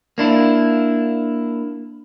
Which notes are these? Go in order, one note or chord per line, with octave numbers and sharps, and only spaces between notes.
A#3 D4 E4